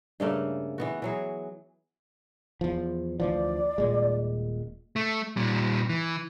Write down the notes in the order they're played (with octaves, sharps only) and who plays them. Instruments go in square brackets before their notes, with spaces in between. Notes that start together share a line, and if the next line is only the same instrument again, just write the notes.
[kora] G2 C#3 A3 A#3
E3 B3 F#4
E3 F#3 G#4
[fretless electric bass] E2 F3
[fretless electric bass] D2 E3 F3 [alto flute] D5
[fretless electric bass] D#1 A#2 G#3
[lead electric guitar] A3
A#2 G3
E3